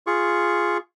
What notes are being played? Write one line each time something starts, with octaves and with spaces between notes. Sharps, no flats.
F4 G#4 C#6